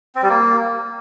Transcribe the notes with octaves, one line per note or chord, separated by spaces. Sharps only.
C4
G3
A#3